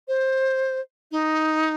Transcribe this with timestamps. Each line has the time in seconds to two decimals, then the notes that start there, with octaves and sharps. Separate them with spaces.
0.08 C5
1.12 D#4